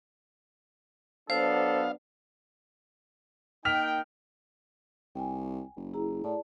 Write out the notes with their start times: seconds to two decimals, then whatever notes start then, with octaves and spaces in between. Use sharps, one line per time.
1.30 F#3 B3 D4 A4 C5 F5
3.65 A#3 D#4 G5 F6 B6 F7
5.15 C2 G5 G#5
5.77 F#1
5.94 E4 G#4 A#5
6.24 A2 D5 A5